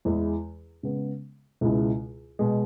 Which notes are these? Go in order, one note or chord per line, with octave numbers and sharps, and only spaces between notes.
E2 E3 G#3 E4
C#3 G#3 B3
C#2 B2 G#3 E4
B2 G#3